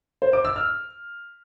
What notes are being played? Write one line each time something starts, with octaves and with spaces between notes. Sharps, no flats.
C5
D6
E6
F6